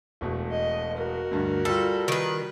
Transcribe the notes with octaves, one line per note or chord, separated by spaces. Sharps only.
E1 B2 A3
D#5
F#4 A#4
D2 G2 D3
G3 F4 A4
D#3 B4